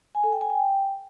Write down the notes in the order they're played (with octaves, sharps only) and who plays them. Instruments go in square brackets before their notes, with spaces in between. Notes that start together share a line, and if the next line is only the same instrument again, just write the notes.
[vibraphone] G#5
A4
G5
G#5
G5